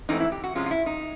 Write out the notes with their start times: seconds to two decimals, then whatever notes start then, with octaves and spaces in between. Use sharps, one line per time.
0.09 G#2 E3 A3 C4 D#4
0.20 E4
0.32 G4
0.44 F#4
0.55 C3 F3 G#3 C#4 F4
0.66 F4
0.71 E4
0.86 D#4